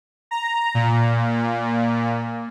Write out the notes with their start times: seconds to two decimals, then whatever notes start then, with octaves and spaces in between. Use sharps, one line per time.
0.31 A#5
0.74 A#2